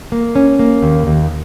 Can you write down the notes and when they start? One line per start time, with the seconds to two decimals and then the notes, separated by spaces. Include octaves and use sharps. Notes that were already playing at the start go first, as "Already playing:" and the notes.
0.12 A#3
0.36 C#4
0.59 A#3
0.82 D#2
1.07 D#2